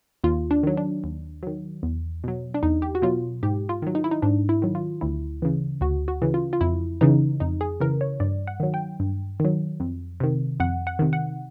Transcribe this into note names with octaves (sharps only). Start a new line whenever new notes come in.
D#2 F4
D4
D#3 F#3
D4
D#2
D#3 F#3
E2
B2 F#3
D4
E2 D#4
G4
F#4
B2 F#3 F4
G#2 G4
F4
D#3 F#3
D#4
E4
D#4
G#2 D4
E4
D#3 F#3
F4
D2 E4
C#3 E3
D2 F#4
F#4
C#3 E3
F4
F4
F2 E4
C#3 E3 D#4
F2 D#4
G#4
C#3 E3 A#4
C#5
G2 D5
F#5
D#3 F#3
G5
G2
D#3 F#3
F2
C3 D#3
F2 F#5
F#5
C3 D#3
F#5